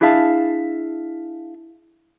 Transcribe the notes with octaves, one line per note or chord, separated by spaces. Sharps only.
D4 E4 G#4 E5 F5 A5